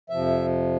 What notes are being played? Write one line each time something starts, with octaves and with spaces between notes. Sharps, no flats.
F2 C3 F3 E5